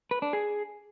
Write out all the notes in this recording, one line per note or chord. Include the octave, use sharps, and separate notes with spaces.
B4
D4
G#4